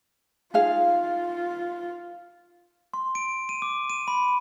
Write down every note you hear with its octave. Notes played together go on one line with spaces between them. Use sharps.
D#4 F4 G#4 F5
C6
D7
D#7
D6
D#7
B5